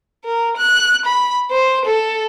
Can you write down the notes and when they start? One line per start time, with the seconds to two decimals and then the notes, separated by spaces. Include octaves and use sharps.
0.25 A#4
0.57 F#6
1.06 B5
1.51 C5
1.85 A4